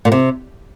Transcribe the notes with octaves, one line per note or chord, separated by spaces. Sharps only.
A#2
C3